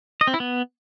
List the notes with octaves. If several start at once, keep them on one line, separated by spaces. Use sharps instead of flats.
D#5
C4
E4
B3